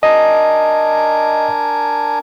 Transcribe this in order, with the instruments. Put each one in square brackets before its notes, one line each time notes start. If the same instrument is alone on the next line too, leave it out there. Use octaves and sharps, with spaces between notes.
[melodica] D4 A#4 G#5 [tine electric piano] D#5